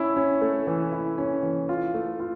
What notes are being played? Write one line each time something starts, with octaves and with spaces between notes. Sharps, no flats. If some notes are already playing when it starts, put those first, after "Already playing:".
Already playing: C#4 E4
C#4
A3
E3
E4
C#4
E3
F4
A3
F4